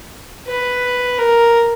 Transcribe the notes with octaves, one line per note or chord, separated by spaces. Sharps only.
B4
A#4